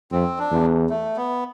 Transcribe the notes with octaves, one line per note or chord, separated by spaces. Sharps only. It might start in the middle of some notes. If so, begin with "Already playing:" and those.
F2 C4
D4
E2
A3
B3